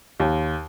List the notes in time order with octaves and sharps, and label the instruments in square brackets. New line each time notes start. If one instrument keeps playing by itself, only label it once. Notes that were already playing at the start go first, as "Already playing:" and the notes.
[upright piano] D#2